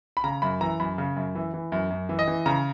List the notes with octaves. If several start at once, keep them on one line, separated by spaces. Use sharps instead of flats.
B5
C#3 A#5
F#2 B5
E3 A#5
F#2 B5
C#3
F#2
E3
E3
F#2
F#2
E3
D#5
E3
C#3 A#5